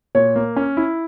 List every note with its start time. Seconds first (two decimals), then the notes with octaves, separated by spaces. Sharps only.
0.15 A#2 C#5
0.36 A#3
0.56 C#4
0.77 E4